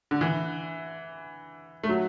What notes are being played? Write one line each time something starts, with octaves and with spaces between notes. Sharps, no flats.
D3
E3
A3
F#3